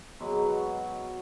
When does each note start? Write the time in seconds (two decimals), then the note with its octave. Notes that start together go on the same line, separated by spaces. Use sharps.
0.20 B2 F#3 G#3
0.45 F#4